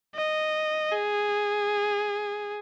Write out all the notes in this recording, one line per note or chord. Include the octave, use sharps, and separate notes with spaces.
D#5
G#4